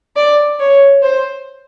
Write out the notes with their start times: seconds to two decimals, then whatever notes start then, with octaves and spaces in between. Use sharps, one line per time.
0.16 D5
0.60 C#5
1.02 C5